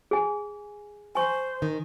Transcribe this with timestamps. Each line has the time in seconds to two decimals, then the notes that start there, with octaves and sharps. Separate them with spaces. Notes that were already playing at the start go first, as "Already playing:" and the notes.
0.11 G#4 G#5
1.15 C5 G#5 C#6
1.62 D#3